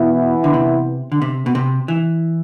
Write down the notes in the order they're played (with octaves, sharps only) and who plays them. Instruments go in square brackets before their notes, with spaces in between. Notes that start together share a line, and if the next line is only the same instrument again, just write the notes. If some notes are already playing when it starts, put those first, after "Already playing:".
Already playing: [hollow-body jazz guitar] B2 [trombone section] E3 B3 E4
[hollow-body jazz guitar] D3
C3
D3
C3
B2
C3
E3